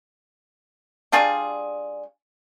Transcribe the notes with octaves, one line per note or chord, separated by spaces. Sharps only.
G3 D4 F4 G#4